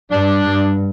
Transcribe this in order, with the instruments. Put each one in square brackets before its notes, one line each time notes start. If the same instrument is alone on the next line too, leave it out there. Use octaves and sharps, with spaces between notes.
[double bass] G2 [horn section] D4
[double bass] G2